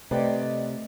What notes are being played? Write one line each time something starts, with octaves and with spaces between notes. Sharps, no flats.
C3 A3 B4 D5 D#5 G5